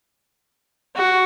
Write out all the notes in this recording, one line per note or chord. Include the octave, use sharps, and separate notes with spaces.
F#4